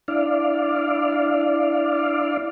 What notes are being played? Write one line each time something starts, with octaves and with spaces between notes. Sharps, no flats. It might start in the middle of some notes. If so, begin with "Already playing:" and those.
D4 E4 D5 F5